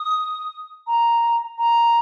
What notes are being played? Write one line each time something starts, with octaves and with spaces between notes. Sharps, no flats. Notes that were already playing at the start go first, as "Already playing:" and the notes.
Already playing: D#6
A#5
A#5